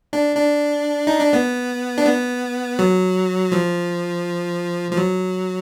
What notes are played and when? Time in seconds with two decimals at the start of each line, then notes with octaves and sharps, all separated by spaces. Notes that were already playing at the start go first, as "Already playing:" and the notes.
0.13 D4
0.36 D4
1.07 D#4
1.20 D4
1.33 B3
1.98 D4
2.06 B3
2.79 F#3
3.52 F3
4.91 F3
4.97 F#3